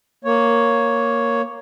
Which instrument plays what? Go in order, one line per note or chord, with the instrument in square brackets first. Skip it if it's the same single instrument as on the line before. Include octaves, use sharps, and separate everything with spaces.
[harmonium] A#3 C#5